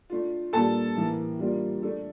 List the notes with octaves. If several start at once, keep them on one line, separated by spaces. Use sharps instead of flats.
A3 D4 F4
A#2 G3 A#3 D4 G4 A4 A5
A2 E3 A#3
G3 A#3 D4 F4
A3 D4 A4